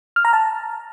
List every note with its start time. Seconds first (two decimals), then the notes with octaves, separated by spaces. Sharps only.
0.16 F6
0.25 A#5
0.33 A5